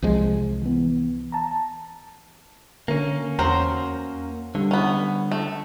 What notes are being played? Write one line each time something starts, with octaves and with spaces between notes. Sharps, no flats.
C2 F3 G#3
E3 B3
A5 A#5
D3 A#3 C#4
E2 F#3 A#4 C5
D3 G3
B3 C#4
A3